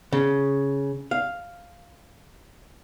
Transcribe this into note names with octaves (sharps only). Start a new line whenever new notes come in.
C#3
F5